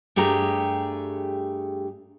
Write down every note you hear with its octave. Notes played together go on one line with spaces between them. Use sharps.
G2 A3 G4 G#4 A#5